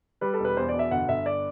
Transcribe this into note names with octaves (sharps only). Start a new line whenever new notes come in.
G3 B4
A4
E1
B4
E2 C5
D5
B2
E5
G1 F#5
G1 E5
D5